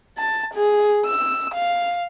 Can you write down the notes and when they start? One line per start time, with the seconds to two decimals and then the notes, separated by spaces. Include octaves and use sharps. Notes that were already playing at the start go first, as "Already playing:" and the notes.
0.18 A5
0.54 G#4
1.05 E6
1.54 F5